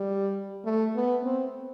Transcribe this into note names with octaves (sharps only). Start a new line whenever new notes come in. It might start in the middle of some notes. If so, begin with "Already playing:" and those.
Already playing: G3
A3
B3
C4